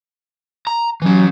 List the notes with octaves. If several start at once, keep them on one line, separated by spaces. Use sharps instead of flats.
A#5
E3 F#3 C#4